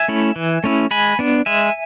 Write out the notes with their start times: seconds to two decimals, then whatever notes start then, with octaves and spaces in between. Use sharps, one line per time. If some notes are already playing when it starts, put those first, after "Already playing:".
Already playing: E5 G#5
0.08 A3 C#4 E4
0.36 E3
0.64 A3 C#4 E4
0.91 G#3 G#5 B5
1.19 B3 D4
1.46 G#3 E5 G#5